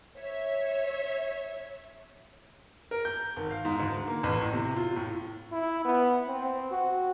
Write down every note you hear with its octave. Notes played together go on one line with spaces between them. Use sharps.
C#5 E5
A#4
G6
G#1
F5
G#2
D2
A#3
A1
A2
C3
F4
A2
E4
B3
C4
F#4